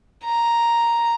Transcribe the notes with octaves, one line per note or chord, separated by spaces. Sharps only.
A#5